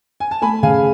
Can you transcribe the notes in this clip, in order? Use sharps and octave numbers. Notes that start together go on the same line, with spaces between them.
G#5
A5
A3 G#5 B5
C#3 F5 G#5